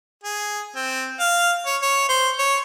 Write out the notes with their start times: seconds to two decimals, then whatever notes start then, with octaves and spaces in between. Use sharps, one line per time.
0.24 G#4
0.75 C4
1.20 F5
1.66 C#5
1.82 C#5
2.09 C5
2.39 C#5